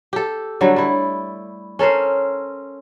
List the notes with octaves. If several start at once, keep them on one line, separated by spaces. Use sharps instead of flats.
G4 A4
D3 F#3 G3 A3
G3 E4
C#4 A4 A#4 C5